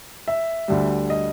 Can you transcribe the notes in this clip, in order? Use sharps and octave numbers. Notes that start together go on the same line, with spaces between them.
E5
D2 D3 G3
D#5